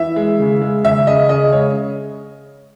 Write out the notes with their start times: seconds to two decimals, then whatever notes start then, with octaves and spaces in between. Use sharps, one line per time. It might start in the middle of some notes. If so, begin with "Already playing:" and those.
Already playing: E3 E5
0.16 G#3
0.39 C#3
0.62 G#3
0.84 C#3 E5
1.07 C#3 D#5
1.29 C#3 D#5
1.52 G#3 C#5